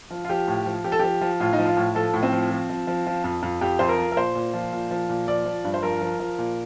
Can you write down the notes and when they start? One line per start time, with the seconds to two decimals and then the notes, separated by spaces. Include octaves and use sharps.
0.10 F3
0.25 F4
0.29 F3 G4
0.48 A2
0.66 F3
0.84 F3 G4
0.92 A4
0.99 F3 G4
1.21 F3
1.40 A2 F4
1.53 D#4
1.58 F3
1.66 F4
1.77 A2
1.95 F3 A4
2.14 A2
2.23 C4
2.32 F3
2.50 F3
2.69 F3
2.87 F3
3.07 F3
3.24 F2
3.43 F2
3.61 F2 G4
3.79 F2 C5
3.89 A#4
3.98 F3
4.12 A#4
4.16 A#2 C5
4.35 A#2
4.54 F3
4.73 A#2
4.91 F3
5.09 A#2
5.27 F3 D5
5.45 F3
5.64 G2
5.74 C5
5.82 F3 A#4
6.01 F3
6.19 F3
6.38 A#2